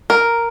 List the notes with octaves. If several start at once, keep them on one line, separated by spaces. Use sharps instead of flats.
A#4